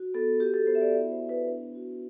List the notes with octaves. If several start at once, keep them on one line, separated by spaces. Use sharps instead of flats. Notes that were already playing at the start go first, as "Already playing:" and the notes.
Already playing: F#4
B3 A4
F#4 G4
A4
B3 C5
E5
D5
E4 E5
C5
B3
B4
D4
F#4